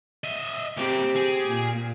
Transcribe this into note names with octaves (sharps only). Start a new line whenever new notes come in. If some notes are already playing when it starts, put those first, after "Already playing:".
D#5 E5
G3 A#3 C4 G4
G#4
A#2